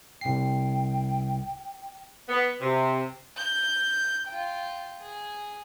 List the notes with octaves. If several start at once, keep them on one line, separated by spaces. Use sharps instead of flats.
C2 G5 C7
B3
C3
G6
F4 G5
G#4